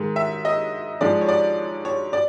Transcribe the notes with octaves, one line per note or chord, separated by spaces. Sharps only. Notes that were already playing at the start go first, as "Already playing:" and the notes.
Already playing: G#2 D#3 G#3
E5
D#5
G#2 F3 G#3 D5
C#5
D5
C#5
D5